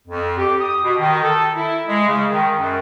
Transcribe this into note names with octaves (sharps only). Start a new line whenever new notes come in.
F2
G4
D#6
B2
D#3
A4
E4
G#3
C#3
D#3
F#2